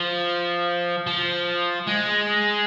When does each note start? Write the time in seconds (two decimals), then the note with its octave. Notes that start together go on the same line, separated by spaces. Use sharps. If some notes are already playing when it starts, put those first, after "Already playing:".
Already playing: F3
1.07 F3
1.87 G#3